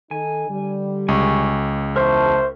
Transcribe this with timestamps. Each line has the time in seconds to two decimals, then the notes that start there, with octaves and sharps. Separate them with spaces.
0.11 D#3 D#4 A4 G#5
0.49 D3 G3
1.08 C#2 G#5 C#6
1.96 E2 A#4 C5 E5 A5 C#6